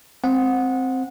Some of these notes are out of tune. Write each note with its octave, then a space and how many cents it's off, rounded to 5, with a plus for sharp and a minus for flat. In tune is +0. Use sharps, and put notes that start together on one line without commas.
C4 +0 F#5 -20